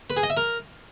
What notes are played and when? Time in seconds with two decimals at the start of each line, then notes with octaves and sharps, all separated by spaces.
0.10 B4
0.16 G#4
0.23 D#5
0.30 E5
0.37 A#4